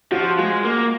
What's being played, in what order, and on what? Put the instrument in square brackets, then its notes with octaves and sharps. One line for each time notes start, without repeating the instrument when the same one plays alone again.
[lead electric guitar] F3 [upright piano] F#4
[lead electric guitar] G#3
A#3